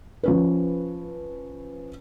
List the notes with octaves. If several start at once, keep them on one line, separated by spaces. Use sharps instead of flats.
F3 C#4 B4